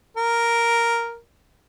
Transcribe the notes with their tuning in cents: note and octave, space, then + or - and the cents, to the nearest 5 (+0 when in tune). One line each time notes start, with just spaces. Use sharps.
A#4 +0